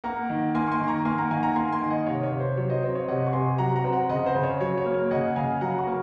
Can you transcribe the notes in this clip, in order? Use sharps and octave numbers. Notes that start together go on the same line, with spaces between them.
A#3 F#5 A#5
D#3
A#3 G#5 C6
C#6
G#5 C6
D#3
A#5 C#6
A#3 G#5 C6
F#5 A#5
D#3 F5 G#5
F#5 A#5
A#3 G#5 C6
G#5 C6
D#3
D#5 F#5
C3 C#5 F5
C#5
C3
C5
F#3 C#5
C5 D#5
C4
C#5 F5
C3 D#5 F#5
C#6
C3 G#5 C6
F#3 F#5 A#5
F#5 A#5
C4
F#5 A#5
C#3 D#5 F#5
C5
C#3
C#5
F#3 C#5
C#5
A#3
C#5
C#3 D#5 F#5
C#3 F5 G#5
F#3 F#5 A#5
A#5 C#6
A#3